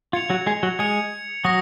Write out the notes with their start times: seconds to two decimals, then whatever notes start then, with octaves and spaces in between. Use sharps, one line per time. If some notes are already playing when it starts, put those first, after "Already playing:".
0.13 F4 G#6 C#7 F7
0.30 F#3 F#4
0.46 G#3 G#4
0.63 F#3 F#4
0.79 G#3 G#4 G#6 C#7 F7
1.44 F#3 F#4 D#6 A#6